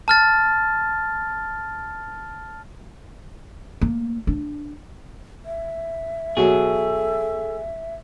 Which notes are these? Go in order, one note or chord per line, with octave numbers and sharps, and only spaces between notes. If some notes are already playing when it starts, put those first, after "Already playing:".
A5 F6 A6
A#3
D4
E5
B2 F#3 G#4 A4